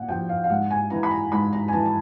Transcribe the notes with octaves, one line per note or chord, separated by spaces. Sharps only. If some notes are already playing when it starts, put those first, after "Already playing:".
Already playing: A#2 F#5
F3 G5
F5
F5
G#2 F#5
G#5
E3 A#5
B5
A#5
G#2 B5
A#5
G#5
E3 A5
A5